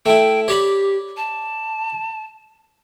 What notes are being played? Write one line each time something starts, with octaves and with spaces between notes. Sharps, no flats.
A3 E4 G5
G4 C#5 D5 B5
A5